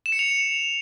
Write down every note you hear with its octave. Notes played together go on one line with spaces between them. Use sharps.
E7
C#7
F7